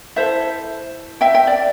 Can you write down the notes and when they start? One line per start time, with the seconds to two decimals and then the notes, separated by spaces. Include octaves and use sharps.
0.16 E4 A4 C5 E5
1.21 E5 G5
1.34 E5 G5
1.47 D5